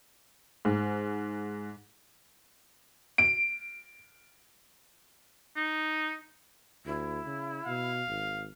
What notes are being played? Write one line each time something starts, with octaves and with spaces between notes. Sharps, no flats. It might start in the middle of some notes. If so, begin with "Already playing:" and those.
G#2
D7
D#4
D2 E4
C#3
B2 F5
G#1